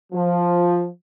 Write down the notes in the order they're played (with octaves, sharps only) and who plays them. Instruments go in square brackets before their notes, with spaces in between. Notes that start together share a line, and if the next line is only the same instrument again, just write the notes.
[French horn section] F3